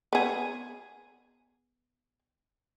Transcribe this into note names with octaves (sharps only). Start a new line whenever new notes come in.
B3 G#4